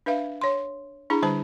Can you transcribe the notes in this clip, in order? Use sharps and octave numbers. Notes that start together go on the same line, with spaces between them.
D4 B4 E5 F5
C#5 C6
D4 E4 G#4 A#5
D3 G3 C5 A5 B5